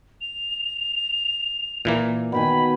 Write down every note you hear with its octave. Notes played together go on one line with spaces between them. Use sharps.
F7
A#2 E3 A#3
B2 D#3 G#5 B5